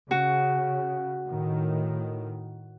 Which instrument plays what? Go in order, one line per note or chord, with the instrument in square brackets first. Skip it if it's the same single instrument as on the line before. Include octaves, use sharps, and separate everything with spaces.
[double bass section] C#3 [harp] F#4
[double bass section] A2 D#3